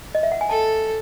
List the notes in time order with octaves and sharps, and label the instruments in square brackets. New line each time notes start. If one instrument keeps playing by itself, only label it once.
[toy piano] D#5
E5
F#5
G#5
[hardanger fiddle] A4 [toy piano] A5